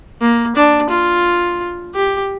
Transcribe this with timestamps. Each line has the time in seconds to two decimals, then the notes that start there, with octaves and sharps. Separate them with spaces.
0.21 A#3
0.56 D4
0.90 F4
1.95 G4